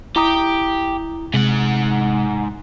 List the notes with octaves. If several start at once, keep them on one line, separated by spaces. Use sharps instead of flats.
E4 G4 A#5 D#6
G#2 C3 G#3 F#5